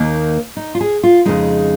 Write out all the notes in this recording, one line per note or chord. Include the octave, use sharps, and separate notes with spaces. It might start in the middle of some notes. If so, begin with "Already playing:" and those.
Already playing: D#2 D#3 A#3 D#4
D#4
F4
G#4
F4
F2 C#3 G#3 D#4